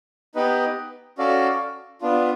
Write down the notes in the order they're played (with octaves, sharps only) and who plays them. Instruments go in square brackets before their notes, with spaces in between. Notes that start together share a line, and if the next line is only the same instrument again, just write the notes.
[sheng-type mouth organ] B3 D#4 G4 B4 D#5
C#4 F#4 A4 D5 F5
B3 D4 F4